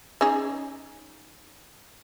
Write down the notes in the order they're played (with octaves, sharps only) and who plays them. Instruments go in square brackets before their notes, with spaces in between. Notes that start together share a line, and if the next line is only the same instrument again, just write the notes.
[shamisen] C#4 D#4 G#4